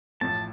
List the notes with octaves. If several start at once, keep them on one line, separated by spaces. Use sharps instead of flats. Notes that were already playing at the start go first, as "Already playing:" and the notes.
A1 A2 F3 A5